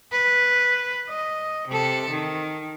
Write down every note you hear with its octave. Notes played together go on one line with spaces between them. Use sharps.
B4
D#5
C3 A4
D#3